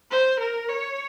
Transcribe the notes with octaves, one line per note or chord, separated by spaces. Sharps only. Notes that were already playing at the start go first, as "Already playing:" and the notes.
C5
A#4
C#5